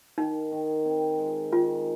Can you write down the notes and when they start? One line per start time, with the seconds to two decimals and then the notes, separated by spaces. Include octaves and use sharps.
0.18 D#3 D#4
0.52 D#3
0.85 C4
1.18 G#3
1.53 D#3 F4